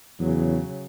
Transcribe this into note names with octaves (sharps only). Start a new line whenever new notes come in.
E2 C#3 F#3